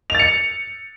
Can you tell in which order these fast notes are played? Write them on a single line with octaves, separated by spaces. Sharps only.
F7 A6 C#7